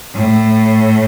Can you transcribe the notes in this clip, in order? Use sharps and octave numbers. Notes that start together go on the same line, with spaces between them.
A2